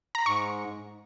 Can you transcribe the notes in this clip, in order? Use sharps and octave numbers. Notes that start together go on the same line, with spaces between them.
A#5
G#2 C#6